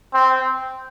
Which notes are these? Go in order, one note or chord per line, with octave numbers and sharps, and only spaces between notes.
C4